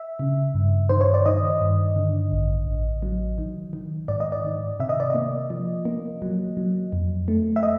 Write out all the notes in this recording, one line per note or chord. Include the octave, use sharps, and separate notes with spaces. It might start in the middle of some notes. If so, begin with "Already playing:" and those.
Already playing: E5
C#3
G2
D#3 C5
C#5
D5
D#3 D#5
G2
D3
A1
A1
F#3
D#3
D#3
G#2 D5
D#5
D5
D#3
C3 E5
D#5
D5
A#3 D#5
F3
A#3
F#3
F#3
F2
A3
E5
D#5